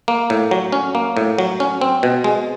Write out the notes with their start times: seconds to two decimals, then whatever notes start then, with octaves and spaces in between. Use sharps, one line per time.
0.08 A#3
0.30 A2
0.51 F#3
0.72 C#4
0.95 A#3
1.17 A2
1.39 F#3
1.60 C#4
1.81 C4
2.03 B2
2.24 G#3